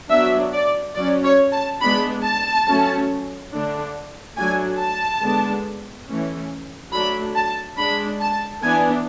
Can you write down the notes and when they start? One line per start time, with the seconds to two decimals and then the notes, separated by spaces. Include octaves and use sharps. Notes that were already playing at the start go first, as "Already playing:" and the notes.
0.10 F#3 B3 D4 E5
0.53 D5
0.95 F#3 C#4 D5
1.24 C#5
1.52 A5
1.81 G#3 B3 D4 B5
2.24 A5
2.67 F#3 A3 C#4
3.52 D3 A3 D4
4.37 F#3 A3 D4 G#5
4.79 A5
5.22 D3 G#3 B3 D4
6.08 E3 A3 C#4
6.92 F#3 A3 D4 B5
7.35 A5
7.77 G#3 D4 B5
8.21 A5
8.62 E3 B3 D4 G#5